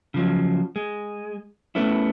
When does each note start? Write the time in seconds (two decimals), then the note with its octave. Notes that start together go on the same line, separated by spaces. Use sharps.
0.14 C#3 F3 F#3
0.76 G#3
1.75 A3 B3 C#4 E4